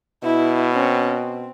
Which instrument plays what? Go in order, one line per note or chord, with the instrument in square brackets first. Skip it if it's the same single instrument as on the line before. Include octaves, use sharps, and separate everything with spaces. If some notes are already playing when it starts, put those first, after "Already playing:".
[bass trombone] B2 [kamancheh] E4
[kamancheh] C4 C#4
C4